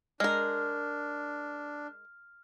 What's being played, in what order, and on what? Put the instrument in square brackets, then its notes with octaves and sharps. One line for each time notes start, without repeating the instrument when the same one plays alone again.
[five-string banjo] G#3 A#4 [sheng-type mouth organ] D4 [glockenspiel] F6